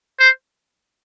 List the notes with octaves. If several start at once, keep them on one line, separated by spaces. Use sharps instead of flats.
C5